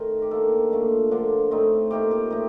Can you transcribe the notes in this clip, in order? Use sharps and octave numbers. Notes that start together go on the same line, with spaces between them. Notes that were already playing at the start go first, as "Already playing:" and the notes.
Already playing: D#3 A3 C4 D#4 A#4
G4
D#3 A#3 D4 A4
A#2 A3 D4
D3 F3 A#3 D4
A2 A3 C4 D#4
A#2 A3 D#4 G4
G4
A2 A3 D#4 G4